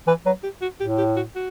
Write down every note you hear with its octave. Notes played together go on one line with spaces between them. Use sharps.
E3 B4
F#3 B4
G4
F#4
A2 G4
G4
F#4
F#4